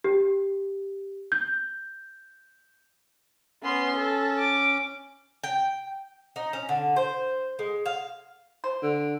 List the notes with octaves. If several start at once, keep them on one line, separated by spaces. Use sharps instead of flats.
G4
G6
B3 C#4 C6
A4
D6
G5
D#4
C#4
D3
C5
G#3
F5
C5
D3